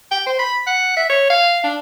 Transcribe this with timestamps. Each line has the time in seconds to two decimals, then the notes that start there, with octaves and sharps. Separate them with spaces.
0.11 G5
0.26 C5
0.39 B5
0.67 F#5
0.97 E5
1.09 C#5
1.30 F5
1.64 D4